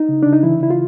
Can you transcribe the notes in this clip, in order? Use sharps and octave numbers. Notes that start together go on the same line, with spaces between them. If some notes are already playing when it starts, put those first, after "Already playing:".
Already playing: D#4
C#3
C#3 D4
D#4
E3 E4
C#3 E4
F4